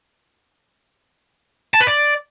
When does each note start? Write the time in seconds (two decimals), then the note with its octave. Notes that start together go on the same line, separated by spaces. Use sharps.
1.74 A5
1.80 B4
1.87 D5